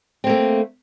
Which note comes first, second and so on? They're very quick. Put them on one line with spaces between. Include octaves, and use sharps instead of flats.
C4 A#3 A3